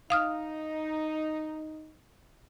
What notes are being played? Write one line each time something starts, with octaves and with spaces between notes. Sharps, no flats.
D#4 F5 D#6 F6